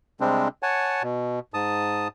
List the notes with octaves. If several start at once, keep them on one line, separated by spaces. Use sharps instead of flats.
C3 G3 G#3 C4 D4
C#5 F#5 G#5 A5
B2
G#2 A5 D#6